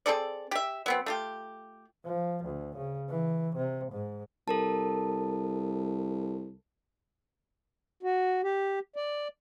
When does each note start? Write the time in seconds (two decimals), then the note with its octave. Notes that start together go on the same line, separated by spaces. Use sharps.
0.06 C4 G#4 A4 D5
0.51 G4 E5
0.86 F#3 B3 C4
1.06 A3 F4 G4
2.05 F3
2.45 D2
2.77 C#3
3.09 E3
3.57 C3
3.92 G#2
4.48 C2 A4 A#4 A5
8.03 F#4
8.44 G4
8.96 D5